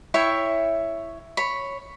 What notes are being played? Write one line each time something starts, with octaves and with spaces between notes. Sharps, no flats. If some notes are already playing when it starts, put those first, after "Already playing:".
E4 C#5 E5 G5
C#5 B5